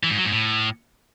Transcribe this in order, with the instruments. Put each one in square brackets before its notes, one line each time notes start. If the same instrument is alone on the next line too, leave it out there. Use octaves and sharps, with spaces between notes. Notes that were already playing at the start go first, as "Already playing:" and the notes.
[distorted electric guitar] E3
G#2
F#3
G#2
A2